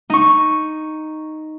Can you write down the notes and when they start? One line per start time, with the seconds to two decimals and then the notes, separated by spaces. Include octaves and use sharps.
0.10 D#4 C#6